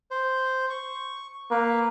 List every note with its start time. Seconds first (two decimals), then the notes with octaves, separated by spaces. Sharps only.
0.11 C5
0.70 C#6
1.51 A#3 B4